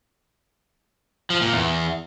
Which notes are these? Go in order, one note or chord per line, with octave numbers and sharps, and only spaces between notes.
F3
A#2
E2